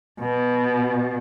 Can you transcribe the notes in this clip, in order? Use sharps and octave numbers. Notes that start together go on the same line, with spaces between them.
B2